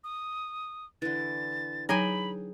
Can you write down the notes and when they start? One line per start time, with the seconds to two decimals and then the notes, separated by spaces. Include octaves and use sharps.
0.04 D#6
1.02 D3 E3 A6
1.89 F#3 D#4 G#4 G5 G#5 A#5 B5